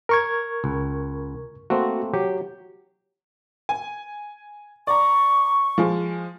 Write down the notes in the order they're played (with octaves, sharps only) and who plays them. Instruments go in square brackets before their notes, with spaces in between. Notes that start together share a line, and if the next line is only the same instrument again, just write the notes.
[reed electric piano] A#4 C#6 G#6
[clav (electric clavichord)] C#2
[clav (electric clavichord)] A3 A#3 C4 [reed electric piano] F#4
[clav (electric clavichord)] F#3 [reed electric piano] G4
[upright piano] G#5
[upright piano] D5 A#5 [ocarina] C#6
[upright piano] F3 G#3